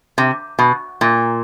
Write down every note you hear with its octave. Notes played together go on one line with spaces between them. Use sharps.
C3
B2
A#2